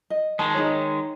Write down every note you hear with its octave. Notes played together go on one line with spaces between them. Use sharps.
D#5
D#3 G#3 A5
D#4 G#4 C#5